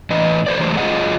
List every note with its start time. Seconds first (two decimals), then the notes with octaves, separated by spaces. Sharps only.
0.11 A2 E3 B4 D#5
0.46 B4 C5 D5
0.60 E3 F#3 G#3 A3 C5
0.77 F#3 F4 G#4 A#4 D#5 F#5